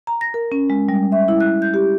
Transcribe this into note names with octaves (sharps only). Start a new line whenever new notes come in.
A#5
A#6
A#4
C#4
G#3
G3
E5
E4
F#6
G6
G4